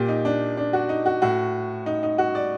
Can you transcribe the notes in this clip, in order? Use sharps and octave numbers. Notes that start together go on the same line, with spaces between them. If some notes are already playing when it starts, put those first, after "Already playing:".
Already playing: A#2 G4
D#4
D4
D4
F#4
D#4
F#4
A2 F#4
D#4
D#4
F#4
D5